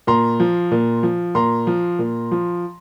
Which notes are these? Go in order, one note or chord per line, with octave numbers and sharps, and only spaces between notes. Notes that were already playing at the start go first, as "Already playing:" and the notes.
A#2 A#5 C6
F3
A#2
F3
A#2 A#5 C6
F3
A#2
F3